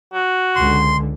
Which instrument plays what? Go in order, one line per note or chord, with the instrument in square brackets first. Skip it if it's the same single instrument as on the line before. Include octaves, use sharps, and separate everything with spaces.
[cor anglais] F#4
[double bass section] C#2 D3 [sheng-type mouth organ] C6